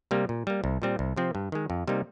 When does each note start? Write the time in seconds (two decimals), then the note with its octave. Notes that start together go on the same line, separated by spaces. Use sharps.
0.11 C3 G3 A#3
0.29 A#2
0.47 G3 A#3
0.64 C2
0.82 A#2 G3 C4
0.99 C2
1.16 C3 F3 C4
1.35 G2
1.52 D#3 G#3
1.70 F2
1.87 C3 G3 A#3 D#4